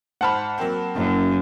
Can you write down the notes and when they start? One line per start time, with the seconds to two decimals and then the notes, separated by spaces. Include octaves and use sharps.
0.21 G#2 C5 F#5 A5 B5 F6
0.58 F#3 A#3 C4
0.96 F#1 F#2